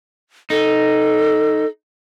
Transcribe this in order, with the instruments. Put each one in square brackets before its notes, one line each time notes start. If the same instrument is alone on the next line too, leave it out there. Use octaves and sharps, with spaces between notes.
[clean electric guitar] D#4 [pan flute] A4